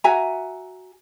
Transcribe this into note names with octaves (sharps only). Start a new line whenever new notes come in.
F#4 E5 G#5 A#5